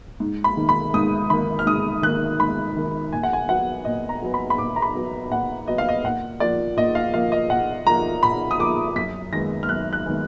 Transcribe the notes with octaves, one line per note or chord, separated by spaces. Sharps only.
G#2
B5
D#3 A#3
B5
G#2 D#6
D#3 A#3 B5
F6
G#2 D#6
D#3 A#3 F#6
G#2 B5
D#3 A#3
A#2 G#5
F#5
G#5
F#3 B3 F#5
A#2 D#5
A#5
F#3 B3
B5
B5
A#2 D6
A#5
B5
F#3 B3
A#2 F#5
F#3 B3 D#5
F5
D#5
A#2 F#5
F3 A#3 D5
A#2 D#5
F5
F3 A#3 F5
D#5
A#2 F#5
F3 A#3 A#5
A#2 B5
D#6
F3 A#3 D6
F#2 B6
D#3 G#3 B3 A#6
F6
F#2 F#6
F#6
D#3 G#3 B3